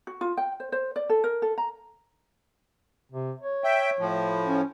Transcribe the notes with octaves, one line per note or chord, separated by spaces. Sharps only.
F#4
F4
G5
C5
C5
D5
A4
A#4
A4
A#5
C3
C#5
E5 G5
A2 F3
C#4